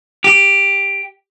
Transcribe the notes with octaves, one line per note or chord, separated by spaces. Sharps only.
G4